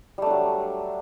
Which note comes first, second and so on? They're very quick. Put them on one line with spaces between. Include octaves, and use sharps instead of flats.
G3 A3 D4 F#3